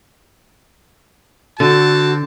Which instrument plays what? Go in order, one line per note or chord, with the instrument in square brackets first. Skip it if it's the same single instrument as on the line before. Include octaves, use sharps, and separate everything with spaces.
[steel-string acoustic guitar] D3 [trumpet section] C4 F#5 A5 [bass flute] F#4